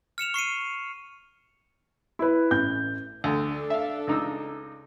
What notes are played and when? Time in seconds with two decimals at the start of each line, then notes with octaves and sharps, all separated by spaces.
0.18 F6 C#7 E7 F7
0.34 C#6 C7 C#7 D#7
2.19 E4 B4
2.51 A1 G6
3.24 D2 D4 A4
3.70 E5 F5
4.07 C#2 D#4 E6